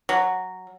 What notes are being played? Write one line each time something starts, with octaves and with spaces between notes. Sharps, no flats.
F#3